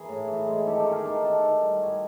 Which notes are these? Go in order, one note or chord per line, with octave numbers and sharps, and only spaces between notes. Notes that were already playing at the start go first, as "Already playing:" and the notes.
Already playing: E3 G#4 A#4
A2
E3
G#3
D#3 G4 A4
G4 A4
D#3
G#4 A#4
D#3 G4 A4
D#3 G4 A4
D#3
G3
G3 F#4 G#4